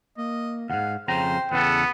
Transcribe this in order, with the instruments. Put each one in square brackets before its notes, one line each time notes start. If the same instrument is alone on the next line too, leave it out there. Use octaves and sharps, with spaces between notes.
[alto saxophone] A#3 [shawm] D#5
[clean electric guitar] D#2 G#2 [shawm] F5 [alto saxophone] F#5
[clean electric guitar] F2 C#3 A#5 [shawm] C5 [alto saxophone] G5
[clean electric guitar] E2 C#3 A4 [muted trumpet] B3 [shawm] F#5